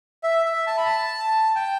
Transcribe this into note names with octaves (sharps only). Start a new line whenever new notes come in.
E5
E5
A5
B5
A5
G5